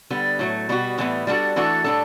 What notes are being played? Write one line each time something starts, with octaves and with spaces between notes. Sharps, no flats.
D3 G3 B3
A2 F#3 A3
B2 G3 B3 F#4
A2 E3 G3 B3
G3 B3 D4 F#4 A4
E3 A3 D4 F#4 A4
A2 G3 D4 A4